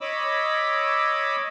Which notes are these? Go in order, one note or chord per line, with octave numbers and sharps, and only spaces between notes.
C#5 D#5 B5 D6 E6